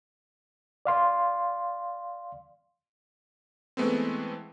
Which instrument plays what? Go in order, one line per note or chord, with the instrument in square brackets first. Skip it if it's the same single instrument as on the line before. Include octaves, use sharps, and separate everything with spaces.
[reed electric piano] D5 F5 C6
[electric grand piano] E3 G#3 A3 B3 C4